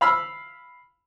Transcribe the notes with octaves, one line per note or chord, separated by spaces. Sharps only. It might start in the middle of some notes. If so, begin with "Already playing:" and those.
F5 B5 E6 F6